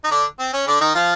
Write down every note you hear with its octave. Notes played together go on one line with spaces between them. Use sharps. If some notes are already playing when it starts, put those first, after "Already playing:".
D#4
D3 D4
C4
C#4
D3 D4
D#3 D#4
F3 F4